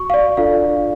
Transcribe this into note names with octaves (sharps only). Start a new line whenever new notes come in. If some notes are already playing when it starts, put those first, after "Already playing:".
Already playing: F#4 C#6
F5
D5
D4 F4 A4 D5 F5